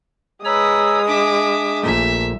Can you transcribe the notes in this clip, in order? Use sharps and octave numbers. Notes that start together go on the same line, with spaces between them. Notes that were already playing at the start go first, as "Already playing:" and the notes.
G#3 B4 C#5 A#5 D#6 E6
D4 E5 D6
A#1 A#2 A3 E5